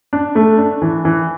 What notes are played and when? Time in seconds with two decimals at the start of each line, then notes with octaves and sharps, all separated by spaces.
0.13 D4
0.35 A3
0.58 D4
0.82 E3
1.05 E3